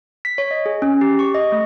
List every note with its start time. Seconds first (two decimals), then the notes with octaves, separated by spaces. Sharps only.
0.25 B6
0.38 C#5
0.51 D#5
0.66 G#4
0.82 C#4
1.01 G4
1.19 C#6
1.35 D#5
1.52 A3